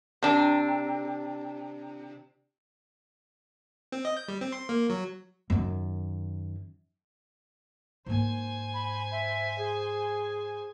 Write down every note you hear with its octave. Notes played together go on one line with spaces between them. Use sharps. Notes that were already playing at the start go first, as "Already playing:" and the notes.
C3 D4
C4
D#5
G6
G3
C4
C6
A#3
F#3
F#2 D#3
G#2 A#3 C5 G#5
B5
E5
G#4